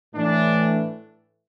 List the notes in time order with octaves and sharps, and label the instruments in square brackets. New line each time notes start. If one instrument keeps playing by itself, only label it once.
[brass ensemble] A2 E3 A3 D4